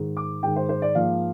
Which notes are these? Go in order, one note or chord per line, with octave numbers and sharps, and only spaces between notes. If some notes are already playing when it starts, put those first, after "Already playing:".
Already playing: G#2 D#3 G#3
D6
G#2 D#3 G#3 G5
C5
C5
D5
G#2 F3 A#3 F5